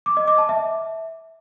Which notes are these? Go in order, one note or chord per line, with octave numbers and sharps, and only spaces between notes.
D6
D#5
D6
A5
E5